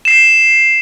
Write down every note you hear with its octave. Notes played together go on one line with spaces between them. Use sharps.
C7 E7